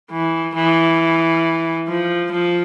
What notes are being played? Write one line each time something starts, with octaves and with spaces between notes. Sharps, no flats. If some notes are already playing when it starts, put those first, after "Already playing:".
E3
E3
F3
F3